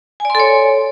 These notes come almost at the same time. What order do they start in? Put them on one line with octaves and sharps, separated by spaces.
G#5 D5 C6 A4 C#5